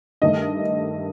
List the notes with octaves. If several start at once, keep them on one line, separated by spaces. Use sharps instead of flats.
G2 D#3 A3 D#5